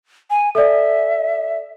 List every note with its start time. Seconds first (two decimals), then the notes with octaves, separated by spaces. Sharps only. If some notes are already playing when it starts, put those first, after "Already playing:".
0.30 G#5
0.55 A4 D5 E5